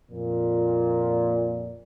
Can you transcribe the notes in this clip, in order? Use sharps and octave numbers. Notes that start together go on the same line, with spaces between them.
F2 A#2